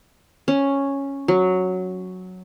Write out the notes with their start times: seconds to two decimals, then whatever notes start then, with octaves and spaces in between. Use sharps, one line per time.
0.48 C#4
1.28 F#3